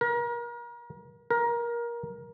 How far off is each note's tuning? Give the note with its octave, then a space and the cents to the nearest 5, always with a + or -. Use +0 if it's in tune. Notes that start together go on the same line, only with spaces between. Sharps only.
A#4 +35
A#4 +20